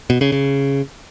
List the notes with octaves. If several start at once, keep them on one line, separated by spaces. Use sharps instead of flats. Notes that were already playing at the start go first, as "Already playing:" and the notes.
B2
C#3
C#3